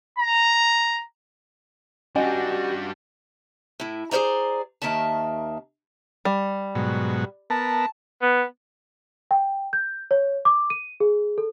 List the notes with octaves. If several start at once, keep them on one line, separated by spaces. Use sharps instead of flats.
A#5
G3 C#4 D4 F#4 G4 D#5 G#5
A2 E4
G#4 A#4 C5 D5 A#5
D#2 D#3 A#3 E5 A5
G3
G#2 B2 F#3
B3 A#4 A5
B3
G5
G6
C#5
D6
D#7
G#4
A4